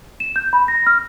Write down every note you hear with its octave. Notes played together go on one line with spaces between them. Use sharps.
E7
G6
B5
A#6
F6